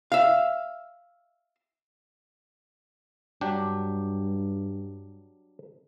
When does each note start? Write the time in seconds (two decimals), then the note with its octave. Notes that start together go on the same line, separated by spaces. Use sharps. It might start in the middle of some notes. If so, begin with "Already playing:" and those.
0.12 E5 F5
3.41 G2 F#3 D4 G4